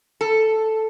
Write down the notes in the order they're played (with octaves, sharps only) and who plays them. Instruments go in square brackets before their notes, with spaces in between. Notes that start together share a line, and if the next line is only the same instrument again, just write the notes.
[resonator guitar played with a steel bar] A4